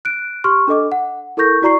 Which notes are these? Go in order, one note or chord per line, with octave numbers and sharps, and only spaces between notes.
F#6 D7
G4 C6 C#6 F6
D4 A4 D#5 D6
F#5
E4 A4 A#4 C#6 G6 A#6
E4 F#4 D5 A#5 C#6 C7